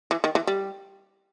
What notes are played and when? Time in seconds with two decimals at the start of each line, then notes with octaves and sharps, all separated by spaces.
0.11 E3
0.24 D#3
0.35 E3
0.47 G3